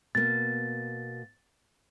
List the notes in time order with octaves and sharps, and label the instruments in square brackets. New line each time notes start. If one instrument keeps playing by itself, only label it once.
[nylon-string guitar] B2 A#3 [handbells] A6